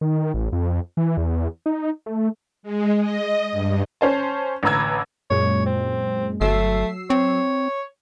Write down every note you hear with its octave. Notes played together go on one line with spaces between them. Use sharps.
D#3
A1
F2
E3
E2
D#4
A3
G#3
D#5
G2
C#4 C5 A5
A1 D3 B4 A#5 E6 G#6
F#2 A#2 G#3 C#5
C4
G1 F#3 A3 E6 C7
C4 C#5